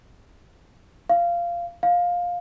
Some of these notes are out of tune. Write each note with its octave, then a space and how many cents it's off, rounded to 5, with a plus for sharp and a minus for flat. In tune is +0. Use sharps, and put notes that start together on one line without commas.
F5 -15
F5 +15